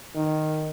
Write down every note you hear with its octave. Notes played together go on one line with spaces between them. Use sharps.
D#3